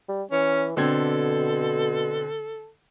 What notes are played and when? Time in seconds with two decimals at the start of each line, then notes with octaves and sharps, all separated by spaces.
0.09 G3
0.32 E3 C#4
0.77 B2 D3 C4 A4 G#6